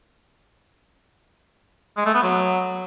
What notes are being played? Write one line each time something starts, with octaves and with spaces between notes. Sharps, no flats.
G#3
A3
B3
F#3